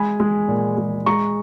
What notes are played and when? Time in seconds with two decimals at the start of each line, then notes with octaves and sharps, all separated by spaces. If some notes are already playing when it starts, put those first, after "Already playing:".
Already playing: G#3 G#5 B5
0.20 G#3
0.48 A#2
0.78 G#3
1.06 G#3 A#5 C#6